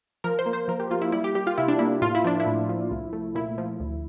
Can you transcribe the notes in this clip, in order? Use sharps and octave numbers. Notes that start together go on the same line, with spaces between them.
F3 A#4
C5
A#3
C5
F3 A#4
G4
A#3 F4
E4
G3 E4
G4
G3 G4
F4
C3 E4
D4
A#3 E4
A2 F4
E4
F3 D4
E4
A2
F3
C2
A3
A#2 E4
F3
D2